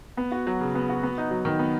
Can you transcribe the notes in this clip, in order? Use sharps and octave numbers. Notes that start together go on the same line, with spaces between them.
B3
F#4
F#3
C#3
B3
F#4
B3
D#4
F#3
D#3
B3